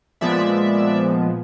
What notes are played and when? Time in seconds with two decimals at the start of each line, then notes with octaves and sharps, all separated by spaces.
0.21 A#2 F3 G#3 B3 D5 E5